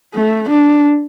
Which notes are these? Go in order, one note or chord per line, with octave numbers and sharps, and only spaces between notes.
A3
D4